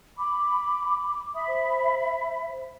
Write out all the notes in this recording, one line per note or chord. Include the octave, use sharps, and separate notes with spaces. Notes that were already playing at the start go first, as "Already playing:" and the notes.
B5 D6
E5 B5 D#6
C5